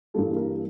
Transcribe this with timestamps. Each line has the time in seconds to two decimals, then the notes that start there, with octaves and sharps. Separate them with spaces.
0.14 G2 E3 G3 A#3 A4
0.36 A#4